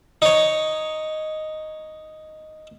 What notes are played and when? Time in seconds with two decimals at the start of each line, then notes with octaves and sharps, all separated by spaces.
0.22 D#4 C#5